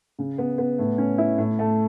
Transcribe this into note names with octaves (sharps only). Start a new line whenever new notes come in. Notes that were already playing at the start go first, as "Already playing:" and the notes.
C#3
B3
B3
A2
C#4
E4
A2
A3